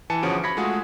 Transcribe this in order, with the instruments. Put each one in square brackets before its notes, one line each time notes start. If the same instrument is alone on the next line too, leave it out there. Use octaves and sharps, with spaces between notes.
[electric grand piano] E3 G#5 A5 C#7
G1 F3 C#4 F#4 G#4 D7
B5 G#6 A#6 B6 C#7
G#3 A3 F4 F#4 G#4